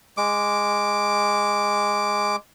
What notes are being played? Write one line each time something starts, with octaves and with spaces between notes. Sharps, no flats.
G#3 D6